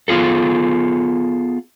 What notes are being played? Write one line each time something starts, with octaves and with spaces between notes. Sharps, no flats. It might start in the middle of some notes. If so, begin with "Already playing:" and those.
B3 F4 G#4 A4